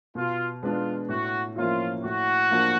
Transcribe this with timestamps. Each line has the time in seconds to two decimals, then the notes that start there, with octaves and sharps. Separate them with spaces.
0.15 B2 F4
0.62 G#3 B3 D4 F4
1.09 A2 F#4
1.56 F3 A#3 C#4 E4 F4
2.03 A2 F#4
2.51 F3 A#3 D4